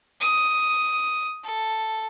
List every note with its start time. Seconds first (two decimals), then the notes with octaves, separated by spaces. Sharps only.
0.21 D#6
1.44 A4